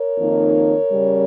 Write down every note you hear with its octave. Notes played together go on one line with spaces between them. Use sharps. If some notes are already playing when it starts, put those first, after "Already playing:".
Already playing: A#4 C#5
F2 D#3 A#3 D#4
C#3 G3 C#4